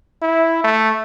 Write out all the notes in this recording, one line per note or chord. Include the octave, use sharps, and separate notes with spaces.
E4
A3